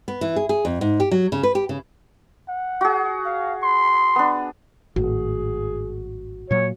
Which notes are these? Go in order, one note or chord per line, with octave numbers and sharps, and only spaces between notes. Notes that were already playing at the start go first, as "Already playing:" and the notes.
B3
E3
G#4
G#4
F2
G#2
G4
F#3
C#3
B4
G4
C#3
F#5
F#4 G#4
F5
C6
B3 D4
G#1 A2 F#4 G#4
A#2 F#3 C#5